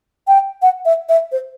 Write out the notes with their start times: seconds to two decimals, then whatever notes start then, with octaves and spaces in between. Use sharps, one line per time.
0.28 G5
0.62 F#5
0.85 E5
1.09 E5
1.32 C5